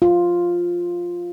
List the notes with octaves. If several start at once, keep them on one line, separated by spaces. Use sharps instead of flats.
F4